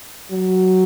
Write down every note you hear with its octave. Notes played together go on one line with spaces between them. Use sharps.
F#3